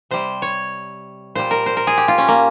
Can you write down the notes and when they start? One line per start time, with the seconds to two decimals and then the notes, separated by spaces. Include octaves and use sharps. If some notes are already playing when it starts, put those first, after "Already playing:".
0.11 C3 G3 C5
0.42 C#5
1.35 A#2 G3 C5
1.51 A#4
1.66 C5
1.77 A#4
1.87 G#4
1.98 G4
2.08 F4
2.18 C#4
2.28 A#3